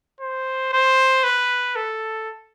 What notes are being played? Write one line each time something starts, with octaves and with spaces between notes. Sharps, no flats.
C5
C5
B4
A4